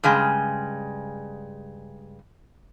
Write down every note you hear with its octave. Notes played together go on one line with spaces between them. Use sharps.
G2 C#3 G#3